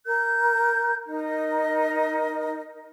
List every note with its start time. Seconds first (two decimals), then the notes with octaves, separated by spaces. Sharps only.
0.06 A#4 G6
1.07 D#4 A#4 D#5